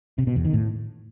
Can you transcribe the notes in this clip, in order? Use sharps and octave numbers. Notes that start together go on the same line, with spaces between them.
C3
B2
E2
D#3
A2